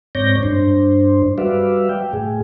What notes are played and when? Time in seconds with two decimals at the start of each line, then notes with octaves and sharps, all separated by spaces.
0.15 G#2 C4 C#5 D5 G6 A#6
0.43 G2 D4 C5
1.38 G3 F#4 B4 D5 E5 F5
1.89 G5
2.13 A2 G#4